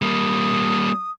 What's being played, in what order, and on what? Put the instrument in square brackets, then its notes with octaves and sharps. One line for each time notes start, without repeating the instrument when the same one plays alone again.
[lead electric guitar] G3 A#3 [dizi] D#6